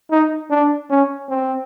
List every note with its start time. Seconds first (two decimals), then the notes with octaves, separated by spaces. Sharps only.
0.11 D#4
0.50 D4
0.90 C#4
1.29 C4